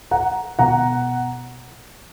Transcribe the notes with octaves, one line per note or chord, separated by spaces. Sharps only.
F#5 A#5
B2 F#5 A#5